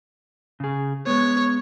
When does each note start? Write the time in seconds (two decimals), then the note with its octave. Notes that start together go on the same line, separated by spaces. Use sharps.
0.60 C#3 G#4
1.07 G#3 B3 C#5